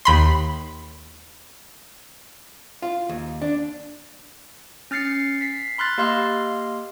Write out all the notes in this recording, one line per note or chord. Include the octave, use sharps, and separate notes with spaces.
D#2 B5 C6
F4
D#2
D4
C#4 F6 A6 C7 C#7
B6 C7
B5 C6 F6 F#6 A6
A#3 G4 D#5 F5 C6 F6